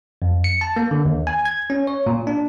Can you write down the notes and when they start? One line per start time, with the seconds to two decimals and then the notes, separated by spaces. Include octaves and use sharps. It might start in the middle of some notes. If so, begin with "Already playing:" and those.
0.22 F2
0.44 C#7
0.61 A5
0.76 A#3
0.91 D3
1.05 D#2
1.27 G#5
1.45 G#6
1.70 C#4
1.87 C#5
2.06 A#2
2.27 D4